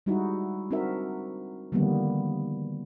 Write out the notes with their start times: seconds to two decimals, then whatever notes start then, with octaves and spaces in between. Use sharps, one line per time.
0.06 G3 G#3 D#4 E4 F#4
0.71 C4 D4 D#4 F#4 A#4 E5
1.72 D3 D#3 F3 G3 A#3 B3